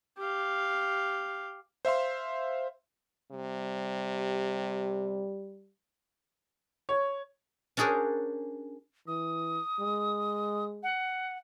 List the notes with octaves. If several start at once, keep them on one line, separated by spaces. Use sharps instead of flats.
G4 F5
C5 E5 F5 C6
C3 G3
C#5
C#4 D4 F#4 G#4 A#4 C5
E3 D#6
G#3
F#5